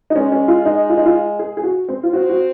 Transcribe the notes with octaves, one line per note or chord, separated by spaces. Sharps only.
D#4
G#3 C#4
C#4
F4
D#4
F4
D#4
F4
G#4
G#4
F#4
C4
F4
C4 F#4
F#4